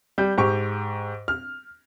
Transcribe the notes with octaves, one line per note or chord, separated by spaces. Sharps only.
G3 G6
G#2 G4 C#6
F6